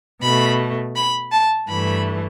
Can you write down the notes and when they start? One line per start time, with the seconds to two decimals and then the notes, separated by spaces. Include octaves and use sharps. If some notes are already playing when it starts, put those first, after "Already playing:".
0.22 B2 A3 B5
0.96 B5
1.32 A5
1.69 G2 E3 A3 B5